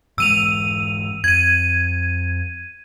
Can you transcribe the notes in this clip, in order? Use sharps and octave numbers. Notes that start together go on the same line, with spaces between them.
G#2 E3 G#3 E6 D#7 F7
F2 G#6 D#7